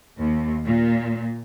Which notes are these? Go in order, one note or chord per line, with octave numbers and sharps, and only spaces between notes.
D#2
A#2